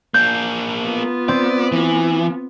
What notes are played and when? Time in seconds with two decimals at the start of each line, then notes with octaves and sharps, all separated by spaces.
0.14 A#3 D4 G6
0.85 B3 F4
1.28 C4 D5
1.72 E3